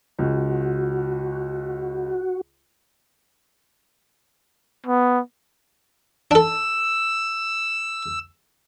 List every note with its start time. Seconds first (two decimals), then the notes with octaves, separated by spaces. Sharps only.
0.19 C#2 F#4
4.87 B3
6.31 D4 A4 E6